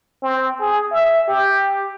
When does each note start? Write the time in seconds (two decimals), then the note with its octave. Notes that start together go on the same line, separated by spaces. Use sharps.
0.23 C4
0.61 G#4
0.92 E5
1.28 G4